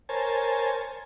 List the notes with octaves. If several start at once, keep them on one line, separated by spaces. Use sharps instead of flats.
A#4 C5 C#5 G#5 A5